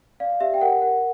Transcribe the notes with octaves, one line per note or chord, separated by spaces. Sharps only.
D5 F5
G4 E5
G5
A#4 F#5
A#4 F#5